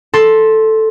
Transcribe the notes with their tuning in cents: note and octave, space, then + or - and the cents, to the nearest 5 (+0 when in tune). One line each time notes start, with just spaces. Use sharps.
A4 +0 C6 +10